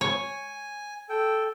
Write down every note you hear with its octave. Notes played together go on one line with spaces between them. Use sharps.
C#5 G#5
A4 G5